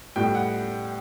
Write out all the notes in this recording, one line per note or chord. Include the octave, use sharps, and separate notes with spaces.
A2 G3 B3 G5
F#5